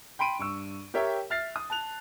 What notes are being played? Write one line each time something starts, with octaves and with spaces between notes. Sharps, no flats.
G5 B5 C6 D7 D#7
G2 C#6 E6
G4 A#4 C#5 E5 G5
E5 F6 A6 C7
D#6
A5 F#6 F7